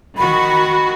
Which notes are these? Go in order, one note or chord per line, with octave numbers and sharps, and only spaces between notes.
D#3 F#4 B5